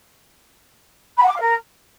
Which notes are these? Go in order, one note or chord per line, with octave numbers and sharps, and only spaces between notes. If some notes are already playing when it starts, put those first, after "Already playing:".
B5
F#5
D6
F5
A#4